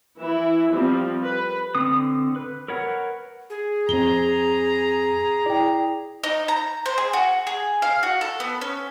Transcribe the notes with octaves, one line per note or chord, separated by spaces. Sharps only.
E3 E4
F3 G3 C4
B4
D3 C4 D#6
B4
A#4 B4 C#5 F#5
G#4
F2 C4 A#5 G7
E4 D5 G5
D#4
A#5
C5
G#4
F#4
G#4
F5
F#4
A4
B3
C#4